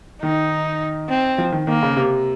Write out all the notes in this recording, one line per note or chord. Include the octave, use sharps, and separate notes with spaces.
D#3 D#4
C4
F3
D#3
D#3 A#3
C#3
C3